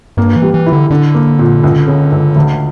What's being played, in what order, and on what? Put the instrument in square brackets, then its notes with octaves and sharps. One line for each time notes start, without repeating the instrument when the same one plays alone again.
[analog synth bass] G2 [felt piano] A#3
[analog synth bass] E3
[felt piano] G3
[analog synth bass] E3
[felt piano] E4
[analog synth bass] D3
[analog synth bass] D3 [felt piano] D4
[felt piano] A#3
A#2
C#2
C#3
C#2
D2